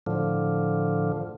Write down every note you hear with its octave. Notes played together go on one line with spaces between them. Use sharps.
A2 D3 F3